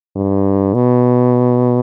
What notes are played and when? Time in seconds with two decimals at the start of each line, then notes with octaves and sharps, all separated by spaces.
0.16 G2
0.74 B2